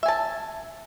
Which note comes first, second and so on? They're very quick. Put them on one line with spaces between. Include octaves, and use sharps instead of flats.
E5 G#5 A5